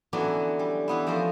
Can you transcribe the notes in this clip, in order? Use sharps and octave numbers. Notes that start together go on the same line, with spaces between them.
D3 E3 F#3 B3 C#4 D4
G3
E3 B3 E4
F3 A3 C#4 A#4 C5